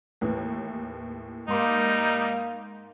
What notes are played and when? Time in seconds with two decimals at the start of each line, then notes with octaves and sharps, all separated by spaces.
0.21 D#2 A2 E3
1.48 G#2 G3 A#3 D#4 C6